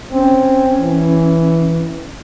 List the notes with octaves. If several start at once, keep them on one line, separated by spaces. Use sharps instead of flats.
C4 C#4
E3